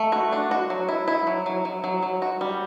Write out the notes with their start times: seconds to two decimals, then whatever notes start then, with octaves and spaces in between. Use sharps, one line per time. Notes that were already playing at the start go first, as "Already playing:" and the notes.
Already playing: A3
0.12 F#4
0.32 D4
0.51 F#4
0.70 F#3
0.89 E4
1.08 E4
1.27 F#3
1.46 F#3
1.65 F#3
1.84 F#3
2.03 F#3
2.22 F#4
2.41 G3